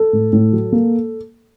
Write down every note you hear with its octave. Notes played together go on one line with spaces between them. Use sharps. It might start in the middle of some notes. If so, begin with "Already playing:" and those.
Already playing: A4
A2
A2
F#3
A#3